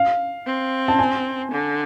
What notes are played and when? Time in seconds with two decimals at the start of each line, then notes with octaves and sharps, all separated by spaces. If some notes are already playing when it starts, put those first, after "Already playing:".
Already playing: F5
0.47 C4
0.88 A5
0.99 G#5
1.52 D3